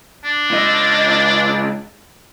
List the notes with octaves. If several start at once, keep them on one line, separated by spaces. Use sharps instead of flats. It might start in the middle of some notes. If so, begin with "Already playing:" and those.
D4
C#2 D#5